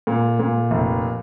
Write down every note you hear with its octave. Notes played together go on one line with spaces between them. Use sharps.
A#2
A#2
F1